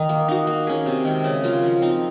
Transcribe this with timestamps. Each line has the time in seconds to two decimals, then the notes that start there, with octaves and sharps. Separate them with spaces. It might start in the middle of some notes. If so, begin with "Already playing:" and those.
Already playing: D#3 D#4
0.09 A#3
0.28 D#4 F#4
0.47 A#3
0.67 C#4 G#4
0.86 C3
1.05 D#3 G#3
1.24 C#3
1.43 F#3 A#3 F4
1.63 F3
1.81 C4 D#4